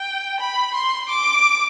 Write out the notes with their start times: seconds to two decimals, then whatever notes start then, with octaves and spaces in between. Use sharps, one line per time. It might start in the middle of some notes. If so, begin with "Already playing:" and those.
Already playing: G5
0.40 B5
0.74 C6
1.09 D6